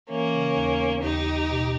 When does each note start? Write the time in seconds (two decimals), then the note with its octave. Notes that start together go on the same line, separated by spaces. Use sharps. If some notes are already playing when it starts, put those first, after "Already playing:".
0.09 E3 A#3 C#4
0.33 C#3
0.56 D#2
0.80 B3
1.02 D#2 D#4 G4
1.26 D#2
1.50 B2